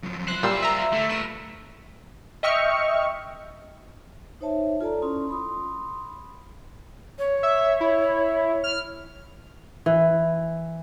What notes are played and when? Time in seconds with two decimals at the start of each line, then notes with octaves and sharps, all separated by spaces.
0.03 F#2 F3
0.28 E4 C5 F#6
0.43 A#2 G3 F4 E6
0.62 E5 A#5
0.93 D3 A3
1.10 A#4 B4 E7
2.43 D#5 E5 G5 C#6 F6 C#7
4.41 D#4 C5 C#5 E5 A5
4.81 F4 A4 D5 A5 A#5
5.02 C#4 E4 F4 C6 D#6
5.29 B5 C6 D#6
7.19 C#5
7.43 E5
7.80 E4
8.64 F6
9.86 E3